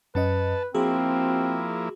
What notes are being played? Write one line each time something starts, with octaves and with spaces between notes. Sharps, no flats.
F#2 C#4 B4 D#5 A5
F3 A#3 C4 E4 F#4 G#4